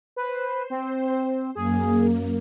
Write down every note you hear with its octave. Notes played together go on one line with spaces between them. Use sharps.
B4 C5
C4
F#2 A#3 G#4